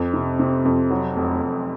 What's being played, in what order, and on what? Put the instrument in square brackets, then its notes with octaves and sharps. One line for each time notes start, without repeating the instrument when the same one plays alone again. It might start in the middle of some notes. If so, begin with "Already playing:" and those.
Already playing: [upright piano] F2
C3
C3
F2
F#3
F1
F1